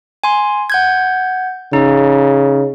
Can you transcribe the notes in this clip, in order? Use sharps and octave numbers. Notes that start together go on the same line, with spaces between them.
G#5 C6
F#5 G6 G#6
C#3 D#4